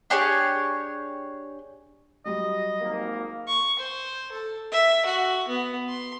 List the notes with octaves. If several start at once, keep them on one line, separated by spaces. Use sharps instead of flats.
D4 G4 G#4 C#5
F#3 G3 D#5
G#1 A#3
C#6
C5
A4
E5
F#4
B3
C6